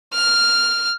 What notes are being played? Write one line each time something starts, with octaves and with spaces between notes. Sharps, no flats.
F6